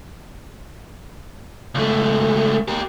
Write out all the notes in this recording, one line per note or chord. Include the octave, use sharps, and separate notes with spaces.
C#2 A3
G4 A#4